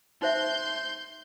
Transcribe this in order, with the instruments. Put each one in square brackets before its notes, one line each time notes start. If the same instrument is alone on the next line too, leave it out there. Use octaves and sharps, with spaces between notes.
[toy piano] D#4 C5 E5 [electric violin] C6 G6